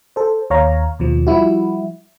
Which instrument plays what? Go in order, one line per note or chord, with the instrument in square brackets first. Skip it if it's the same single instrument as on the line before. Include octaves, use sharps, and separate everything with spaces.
[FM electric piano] A4 C5
D#2 C#5 F5 A#5
D#2 B2 F3
F3 G3 E4 F#4